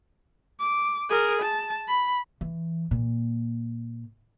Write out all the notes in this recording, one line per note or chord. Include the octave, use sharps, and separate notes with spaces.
D6
G#4 A#4
A5
B5
E3
A#2